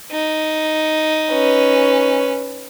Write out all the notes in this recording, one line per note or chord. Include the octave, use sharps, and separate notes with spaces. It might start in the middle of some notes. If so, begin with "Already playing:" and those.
D#4
C#4 B4